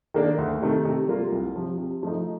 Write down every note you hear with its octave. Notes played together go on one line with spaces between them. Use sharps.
D#3 A#3 D4
D2
C3 D#3 A3
C3
G3 A#3 F4
C2
C3 F3
C3
F3 A3 D#4